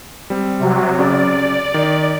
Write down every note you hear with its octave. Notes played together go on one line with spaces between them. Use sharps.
G3 C4
C3 F#3
C#3 D5
D#3